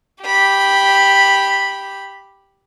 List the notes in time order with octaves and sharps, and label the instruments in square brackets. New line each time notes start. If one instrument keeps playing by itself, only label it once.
[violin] G4 B5